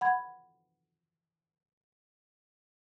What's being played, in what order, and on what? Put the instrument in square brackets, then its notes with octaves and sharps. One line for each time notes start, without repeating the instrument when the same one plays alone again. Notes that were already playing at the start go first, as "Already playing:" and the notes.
[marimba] F#5 B5 G#6